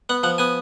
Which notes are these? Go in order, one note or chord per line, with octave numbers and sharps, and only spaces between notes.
B3 F#5
F3 F#5
B3 G#5